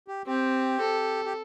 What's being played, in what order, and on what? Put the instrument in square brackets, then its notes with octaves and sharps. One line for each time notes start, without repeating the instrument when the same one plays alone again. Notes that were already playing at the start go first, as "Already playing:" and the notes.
[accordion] G4
[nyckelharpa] C4 [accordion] G4
[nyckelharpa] A4
[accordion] G4